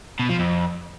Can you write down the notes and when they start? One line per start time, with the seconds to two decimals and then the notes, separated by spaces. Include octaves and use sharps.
0.20 B2
0.29 F3
0.39 F2